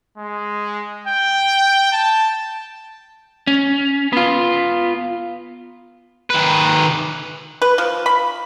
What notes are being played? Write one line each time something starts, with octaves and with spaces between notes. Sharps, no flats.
G#3
G5
A5
C#4
B3 F4
D#3 B4
B4
F3
B5